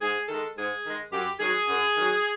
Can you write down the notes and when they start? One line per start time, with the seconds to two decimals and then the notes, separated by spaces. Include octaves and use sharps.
0.01 G#2 G#4
0.29 D#3 G#3 A4
0.57 G#2 G#4
0.85 D#3 G#3
1.12 F#2 G4
1.40 D#3 F#3 G#4
1.67 F#2
1.96 D#3 F#3